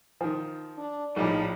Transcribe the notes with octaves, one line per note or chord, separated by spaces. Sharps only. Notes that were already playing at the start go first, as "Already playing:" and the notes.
D#3 F3
D4
A#1 A2 F3 G3 D#4